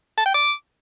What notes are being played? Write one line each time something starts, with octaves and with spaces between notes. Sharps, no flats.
A5
G5
D6